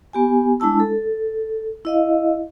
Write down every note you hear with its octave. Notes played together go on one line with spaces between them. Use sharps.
B3 G4 G#5
G#3 D4 E4 A5 E6
A4
E4 D#5 F5